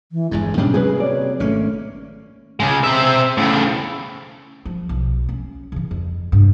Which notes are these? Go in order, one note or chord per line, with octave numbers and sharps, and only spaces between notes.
E3
G1 E2 G2 G#3
G#2 B2 G3 C#4 D4
C3 F#3 A#3 G#4 B4
C#5 D5
G#1 A3 A#3 C#4
C#3 G#3
C4 E5
A2 C#3
F3
B1
C#4
C#3 E3
F2
G2 C3